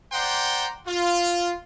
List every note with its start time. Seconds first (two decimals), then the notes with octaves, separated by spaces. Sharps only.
0.13 C5 D5 F#5 G5 A#5 C6
0.87 F4